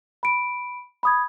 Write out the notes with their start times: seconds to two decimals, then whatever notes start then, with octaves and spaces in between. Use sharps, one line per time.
0.23 B5 D7
1.03 B5 D#6 G#6